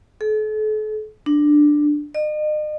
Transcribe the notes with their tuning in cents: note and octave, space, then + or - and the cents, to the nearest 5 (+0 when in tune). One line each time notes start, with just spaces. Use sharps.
A4 -40
D4 +10
D#5 -40